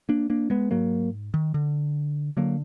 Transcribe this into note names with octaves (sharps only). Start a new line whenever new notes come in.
A#3 D4
A#3 D4
G#3 B3
G#2 F#3 A#3
D#3
D3
D3 F#3 A#3